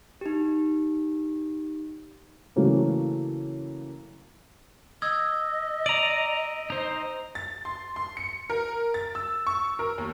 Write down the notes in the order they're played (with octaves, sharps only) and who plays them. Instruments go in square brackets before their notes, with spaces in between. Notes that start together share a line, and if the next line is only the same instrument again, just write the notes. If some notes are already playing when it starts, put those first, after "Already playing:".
[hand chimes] D#4 G4
[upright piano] C#3 E3 F#3 A3 A#3 C#4
[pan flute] D#5 [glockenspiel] D#6 E6 G#6
[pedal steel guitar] D5 A#5 [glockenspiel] D7 D#7 F#7
[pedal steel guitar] D#4 C5
[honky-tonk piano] A6
C6
C6
C#7
A#4
A6
E6
C#6
A#4
D#2